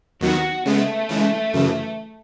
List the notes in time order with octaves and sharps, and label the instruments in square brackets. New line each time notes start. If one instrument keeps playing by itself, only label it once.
[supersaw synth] D#2 D#3 F#3 B3 [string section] F#4
[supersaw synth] C#3 G#3 B3 [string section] A3
[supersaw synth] C#3 E3 G#3
F#2 C#3 E3